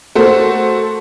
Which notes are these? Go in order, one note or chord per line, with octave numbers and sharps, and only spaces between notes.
A3 A#3 F#4 A4 C5